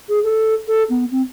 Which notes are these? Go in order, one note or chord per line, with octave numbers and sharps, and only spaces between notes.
G#4
A4
A4
B3
C4